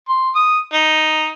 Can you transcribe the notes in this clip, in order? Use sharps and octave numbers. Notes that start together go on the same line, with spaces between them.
C6
D#6
D#4